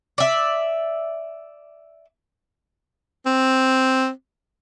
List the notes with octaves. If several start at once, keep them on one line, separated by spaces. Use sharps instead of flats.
D5 E5
C4